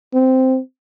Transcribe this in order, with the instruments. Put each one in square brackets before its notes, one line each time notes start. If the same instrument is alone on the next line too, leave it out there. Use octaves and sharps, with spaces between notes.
[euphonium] C4